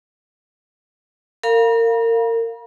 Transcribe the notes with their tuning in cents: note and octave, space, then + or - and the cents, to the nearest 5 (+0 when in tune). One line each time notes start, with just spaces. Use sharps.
A#4 -30 F5 +0 A#5 +45